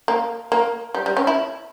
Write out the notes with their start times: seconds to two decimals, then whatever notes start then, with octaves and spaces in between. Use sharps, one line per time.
0.08 A#3
0.52 A#3
0.94 G3
1.06 G3
1.17 C#4
1.27 E4